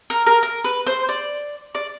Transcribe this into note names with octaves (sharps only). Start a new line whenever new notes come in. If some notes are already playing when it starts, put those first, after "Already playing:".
A#4
A#4
A#4
B4
C5
D5
D5